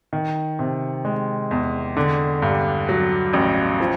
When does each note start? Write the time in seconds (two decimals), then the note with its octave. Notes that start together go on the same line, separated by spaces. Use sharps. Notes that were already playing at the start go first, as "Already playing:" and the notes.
0.13 D#3
0.59 C3
1.05 G#3
1.51 E2
1.97 D3
2.42 G2
2.89 F#3
3.33 A1
3.80 F3